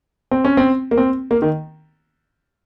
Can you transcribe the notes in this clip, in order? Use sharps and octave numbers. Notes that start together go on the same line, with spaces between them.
C4
C#4
C4
A#3
C4
A#3
D#3